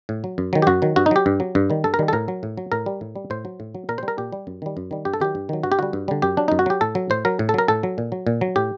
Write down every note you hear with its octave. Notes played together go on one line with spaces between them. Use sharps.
A2
F#3
F#2
D#3 F#3
G4
F#2 F#4
D#3 F#3
G2 F#4
D#4
F#3 G4
G2
F#3
G2
D#3 G3
G2 A4
A#4
D#3 G3
A4
A2 A#4
F#3
A2
F#3
A2 A#4
G3
A2
G3
A2 C5
F#3
A2
F#3
A#2 A#4
C5
G3
A#4
A#2 G4
G3
F#2
D#3 G3
F#2
D#3 G3
G2 G4
A4
D#3 F#3 G4
G2
D#3 F#3
G2 F#4
G4
D3 G3 F#4
G2
D3 G3
F#2 G4
F#3 D4
F#2 D#4
F#4
F#3 G4
A2 A4
F#3
A2 C5
F#3 A#4
A2
A4
F#3 A#4
A2 A4
F#3
A#2
F#3
A#2
F#3
A2 G4